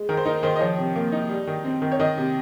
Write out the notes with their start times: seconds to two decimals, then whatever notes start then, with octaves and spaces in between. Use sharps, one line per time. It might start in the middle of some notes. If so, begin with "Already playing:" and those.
Already playing: G#3
0.09 D#3 A#4
0.17 C5
0.25 D#4 A#4
0.43 D#3 C5
0.56 D#5
0.60 F3 C#5
0.79 C3
0.96 A#3
1.12 D#4
1.30 G3
1.47 D#3
1.65 C4
1.82 D#3
1.92 C#5
2.00 D#3 D#5
2.18 C3